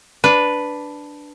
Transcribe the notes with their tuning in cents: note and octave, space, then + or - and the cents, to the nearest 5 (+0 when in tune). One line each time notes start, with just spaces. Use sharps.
D4 +0 B4 +0